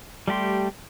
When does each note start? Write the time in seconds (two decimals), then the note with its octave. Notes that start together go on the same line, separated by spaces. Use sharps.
0.28 G3 A3 G4 C6